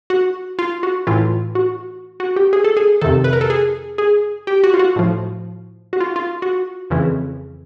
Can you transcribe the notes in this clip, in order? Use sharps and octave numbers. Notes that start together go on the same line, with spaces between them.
F#4
F4
F#4
A2 E3 F4
F#4
F#4
G4
G#4
A4
G#4
F2 C3 D#3 A4
B4
A#4
A4
G#4
G#4
G4
F#4
F4
F#4
A2 F3
F#4
F4
F4
F#4
F2 C#3 E3